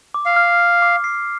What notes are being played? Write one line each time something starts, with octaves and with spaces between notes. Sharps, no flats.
D6
F5
F6
C7
D6
C7